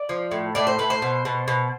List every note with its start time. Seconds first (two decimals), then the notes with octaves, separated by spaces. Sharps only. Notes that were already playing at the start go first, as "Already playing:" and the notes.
Already playing: D5
0.09 F3
0.32 A2
0.55 A2 D5
0.67 C5
0.79 A2 B4
0.90 C5
1.02 B2
1.25 B2
1.48 B2